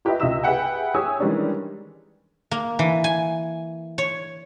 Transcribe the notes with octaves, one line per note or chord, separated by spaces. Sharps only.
F4 G4 B4 D#5 E5
C#2 F4 D#5 E5 E6 E7
G4 G#4 B4 E5 F#5 G5
G4 G#4 C#5 G#5 D#6 E6
D#3 E3 G3 G#3 C#4 D4
A#3
E3
G#5
C#5